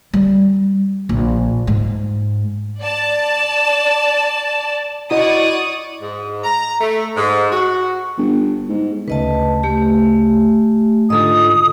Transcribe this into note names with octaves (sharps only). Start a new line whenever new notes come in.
G3
A#1
G#2
D5 A5
E4 F#4 D5 D#5 C#6 D#6
G#2
A#5
A3
G#2
F#4
G1
G#2
D2 C#3 B4 D#5 A5
A3 G4
G#2 D3 F4 A4 D#5 D#6